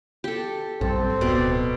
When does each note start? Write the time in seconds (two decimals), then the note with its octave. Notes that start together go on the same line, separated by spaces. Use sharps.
0.24 G4 A4
0.81 A#1 G2 G3 C4 A4
1.21 D1 B2 D5